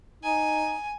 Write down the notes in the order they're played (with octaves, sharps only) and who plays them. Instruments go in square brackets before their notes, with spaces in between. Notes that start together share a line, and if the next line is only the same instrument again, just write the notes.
[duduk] D#4 [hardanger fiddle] G#5